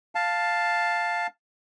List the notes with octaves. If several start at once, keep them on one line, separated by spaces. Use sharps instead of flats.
F5 A5